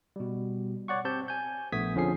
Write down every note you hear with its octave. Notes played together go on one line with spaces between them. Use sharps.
B2 G3
C#5 D5 F#5 C#6
C4 G4 A5 G6
G#5 G6
A#1 A3 B3 D#6 G#6 B6
F2 D3 F3 C#4 G#4 C7